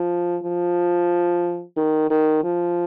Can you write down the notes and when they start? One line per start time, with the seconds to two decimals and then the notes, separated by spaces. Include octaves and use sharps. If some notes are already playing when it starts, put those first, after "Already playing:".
Already playing: F3
0.43 F3
1.77 D#3
2.10 D#3
2.44 F3